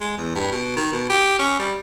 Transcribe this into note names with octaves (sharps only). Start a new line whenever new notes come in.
G#3
E2
G2
B2
D#3
B2
G4
C#4
G3